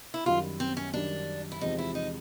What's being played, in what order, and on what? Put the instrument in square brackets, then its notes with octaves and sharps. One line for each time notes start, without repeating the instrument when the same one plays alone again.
[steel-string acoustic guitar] E4
[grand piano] F#2 D#3 G3 [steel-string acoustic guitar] F4
[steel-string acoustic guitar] C4
C#4
[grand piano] F#2 D#3 G3 [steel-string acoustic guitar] D4
[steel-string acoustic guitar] E4
[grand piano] E2 C3 F3 G#3 C4 [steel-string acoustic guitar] D#4
[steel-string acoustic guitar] E4
D#4